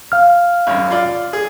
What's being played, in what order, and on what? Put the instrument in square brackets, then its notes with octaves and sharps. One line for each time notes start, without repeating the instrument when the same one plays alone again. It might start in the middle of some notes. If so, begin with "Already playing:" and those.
[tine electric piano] F5 F6
[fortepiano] G#1 F#2
F4 D5
G#4